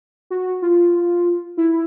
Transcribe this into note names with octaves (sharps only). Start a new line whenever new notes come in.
F#4
F4
E4